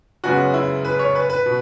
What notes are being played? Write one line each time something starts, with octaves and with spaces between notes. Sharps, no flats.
F#2 C#3 G#3 B3 F#4
E4
B4
C#5
B4
B4
B2